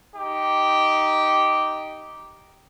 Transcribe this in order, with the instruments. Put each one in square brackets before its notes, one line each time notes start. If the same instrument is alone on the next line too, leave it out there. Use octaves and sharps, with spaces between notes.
[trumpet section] D#4 G4